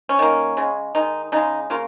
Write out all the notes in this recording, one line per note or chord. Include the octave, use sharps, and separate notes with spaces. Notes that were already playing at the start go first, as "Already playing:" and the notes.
C#4
D#3 A#3
C#3 G#3
D#3 G#3 D#4
C#3 G#3 D#4
C#3 A#3 F4